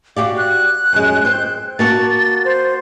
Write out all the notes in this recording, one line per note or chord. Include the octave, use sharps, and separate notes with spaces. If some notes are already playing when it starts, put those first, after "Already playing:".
F#4 G4 D5 F5
F#6
F#2 G#3
C4 C5
A#3 F#4 A5 A6
C5